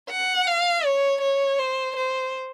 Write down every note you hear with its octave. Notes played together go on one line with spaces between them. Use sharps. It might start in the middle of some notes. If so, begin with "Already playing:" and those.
F#5
F5
C#5
C#5
C5
C5